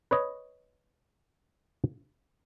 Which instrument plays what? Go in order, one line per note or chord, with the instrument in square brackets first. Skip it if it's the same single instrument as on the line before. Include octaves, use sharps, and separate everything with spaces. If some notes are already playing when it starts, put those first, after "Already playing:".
[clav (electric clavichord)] B4 C#5 D#5